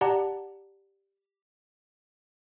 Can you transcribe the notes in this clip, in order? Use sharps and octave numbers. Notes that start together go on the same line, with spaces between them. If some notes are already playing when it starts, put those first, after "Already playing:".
G4 D5 F#5 A5 A#5